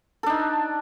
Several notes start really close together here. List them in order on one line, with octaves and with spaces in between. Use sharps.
A4 D4 D#4